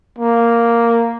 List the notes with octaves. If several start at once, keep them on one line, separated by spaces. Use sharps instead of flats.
A#3